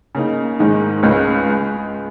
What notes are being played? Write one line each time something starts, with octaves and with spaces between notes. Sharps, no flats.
C#3 A#3 D#4
G#2 D#3 G#3 D#4
C#2 C#3 G#3
G#3